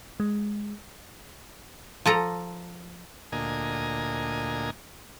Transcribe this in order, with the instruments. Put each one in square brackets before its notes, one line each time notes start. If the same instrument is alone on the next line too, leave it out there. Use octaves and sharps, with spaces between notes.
[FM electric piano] G#3
[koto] F3 A4 A#5
[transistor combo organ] D2 A#2 D#5 G#5 A#5